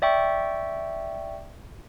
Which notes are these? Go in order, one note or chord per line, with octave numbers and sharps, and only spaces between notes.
D5 E5 G5 C#6